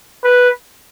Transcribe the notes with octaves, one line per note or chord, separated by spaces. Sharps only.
B4